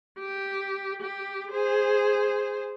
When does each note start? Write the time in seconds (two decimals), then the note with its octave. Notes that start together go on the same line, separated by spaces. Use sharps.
0.19 G4
1.01 G4
1.51 G#4 C5